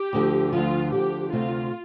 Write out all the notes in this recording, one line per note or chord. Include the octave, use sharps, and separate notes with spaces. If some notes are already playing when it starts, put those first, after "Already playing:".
Already playing: G4
D2 D3 F3
D2 D3 F3 F4
D2 D3 F3 G4
D2 C3 A3 F4